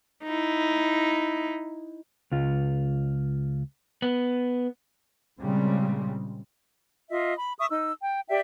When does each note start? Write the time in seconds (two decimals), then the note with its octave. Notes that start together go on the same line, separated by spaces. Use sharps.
0.23 D#4 E4
2.32 C#2 F4
4.02 B3
5.39 A#2 C#3 G3 G#3 C4
7.10 F4 D#5 E5
7.38 B5
7.59 E5 C#6 D#6
7.70 D#4 E6
8.00 G5
8.29 G4 D5 E5 G5